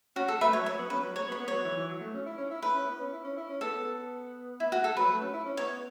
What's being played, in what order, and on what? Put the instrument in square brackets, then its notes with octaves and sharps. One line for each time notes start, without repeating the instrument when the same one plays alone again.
[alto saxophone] C#4 [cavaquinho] F#4
[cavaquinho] A4
[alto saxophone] A3 [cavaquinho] B4 E5
[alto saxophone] F#3 [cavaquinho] C#5
[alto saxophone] F#3 [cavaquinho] C#5
[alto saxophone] B3
[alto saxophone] C#4 [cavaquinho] B4
[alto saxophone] F#3
[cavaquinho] C#5
[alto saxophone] B3
[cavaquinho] C#5
[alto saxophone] B3
[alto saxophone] F#3 [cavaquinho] C#5
[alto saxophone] E3
E3
F#3
A3
C#4
E4
C#4
E4
[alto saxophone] E4 [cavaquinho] B4
[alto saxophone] C#4
B3
C#4
E4
C#4
E4
C#4
[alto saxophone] B3 [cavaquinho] A4
[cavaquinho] E4
F#4
A4
[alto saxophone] F#3 [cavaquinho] B4
[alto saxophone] A3
C#4
E4
C#4
[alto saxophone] B3 [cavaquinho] C#5